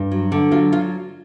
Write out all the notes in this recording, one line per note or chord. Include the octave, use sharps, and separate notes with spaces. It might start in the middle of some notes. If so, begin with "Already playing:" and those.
Already playing: G2
F#3
D3
F#3 F4
F4